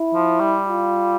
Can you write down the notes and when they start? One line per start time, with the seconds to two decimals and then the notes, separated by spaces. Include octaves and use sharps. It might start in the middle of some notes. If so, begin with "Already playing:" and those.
Already playing: E4
0.14 F3
0.40 G3
0.66 F4